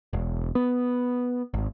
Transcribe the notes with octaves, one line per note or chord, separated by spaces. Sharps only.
E1
B3
G#1